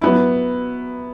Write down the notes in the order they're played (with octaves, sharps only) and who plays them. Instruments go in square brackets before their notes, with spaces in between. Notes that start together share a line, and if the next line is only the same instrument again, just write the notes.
[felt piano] F#3 B3 E4